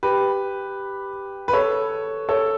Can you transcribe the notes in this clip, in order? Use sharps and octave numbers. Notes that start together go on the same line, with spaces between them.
G4 B4
B4
A4 C#5
A4 C#5